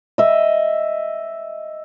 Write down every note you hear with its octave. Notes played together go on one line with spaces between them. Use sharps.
D#5 E5